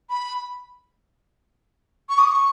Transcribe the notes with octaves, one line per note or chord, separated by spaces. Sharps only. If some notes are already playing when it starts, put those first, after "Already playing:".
B5
C#6
D#6
C#6